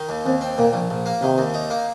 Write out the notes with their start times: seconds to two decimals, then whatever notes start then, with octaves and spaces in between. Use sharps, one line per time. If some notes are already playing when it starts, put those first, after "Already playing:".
Already playing: D#3
0.09 D#2
0.26 D#2 C4
0.41 C4
0.58 A#2 A#3
0.73 A#1
0.90 A#1
1.06 A#3
1.22 C3 D#3
1.38 D#2
1.54 D#4
1.70 A#3